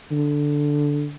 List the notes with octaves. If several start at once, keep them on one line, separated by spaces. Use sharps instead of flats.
D3